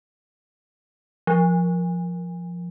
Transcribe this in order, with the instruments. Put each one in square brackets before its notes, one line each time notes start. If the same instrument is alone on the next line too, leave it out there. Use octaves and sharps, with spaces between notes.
[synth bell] F3